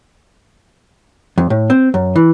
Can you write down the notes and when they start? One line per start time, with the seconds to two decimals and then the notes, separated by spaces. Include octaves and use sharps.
1.38 F2
1.50 A2
1.70 C4
1.94 F#2
2.16 E3